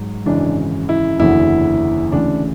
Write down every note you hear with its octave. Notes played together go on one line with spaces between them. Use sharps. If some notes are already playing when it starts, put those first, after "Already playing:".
Already playing: G#2 F#3
G#1 F#2 C#3 E3 D4
E4
F#1 E2 D3 F#3 E4
D2 C#3 E3 D4